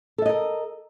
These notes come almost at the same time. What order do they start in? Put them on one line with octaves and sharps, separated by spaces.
A4 E5 D#5 A#4